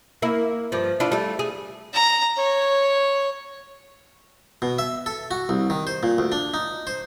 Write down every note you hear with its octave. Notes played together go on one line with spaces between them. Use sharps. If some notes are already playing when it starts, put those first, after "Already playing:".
A#3 E4
G2 F3
D4 E4 F4
G3 A3
G#4
A#5
C#5
B2
E5
A4
F#4
C2
D#3
C5
A#2
D2
D4
D#4
C5